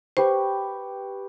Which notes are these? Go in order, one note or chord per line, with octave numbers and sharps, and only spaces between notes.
G4 B4 C5 C#6